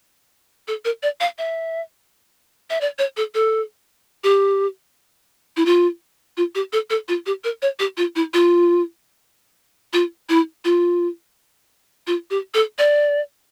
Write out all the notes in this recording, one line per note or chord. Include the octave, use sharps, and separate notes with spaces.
A4
A#4
D5
F5
E5
E5
D5
C#5
A4
A4
G4
E4
F4
F4
G4
A4
A4
F4
G4
A#4
C#5
G4
F4
E4
F4
F4
E4
F4
F4
G4
A4
D5